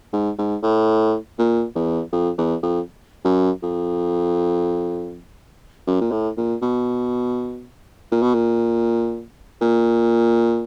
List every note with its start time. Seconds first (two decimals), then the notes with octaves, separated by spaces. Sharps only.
0.13 G#2
0.39 G#2
0.63 A2
1.39 A#2
1.75 E2
2.13 F2
2.38 E2
2.63 F2
3.25 F#2
3.63 F2
5.87 F#2
6.01 A#2
6.12 A2
6.37 A#2
6.62 B2
8.12 A#2
8.22 B2
8.34 A#2
9.62 A#2